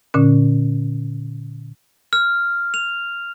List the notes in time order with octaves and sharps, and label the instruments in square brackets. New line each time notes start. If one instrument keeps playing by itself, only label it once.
[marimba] A#2 D3 C#4
[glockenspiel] F6
F7